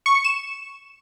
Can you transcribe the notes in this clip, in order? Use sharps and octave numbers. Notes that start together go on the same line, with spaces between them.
C#6
C#7
E7